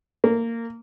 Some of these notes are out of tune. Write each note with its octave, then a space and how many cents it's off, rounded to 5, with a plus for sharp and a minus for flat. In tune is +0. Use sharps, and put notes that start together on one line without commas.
A#3 -15